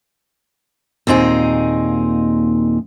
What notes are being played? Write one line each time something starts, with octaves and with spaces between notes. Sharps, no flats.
D#2 A#2 C4 D#4 G#4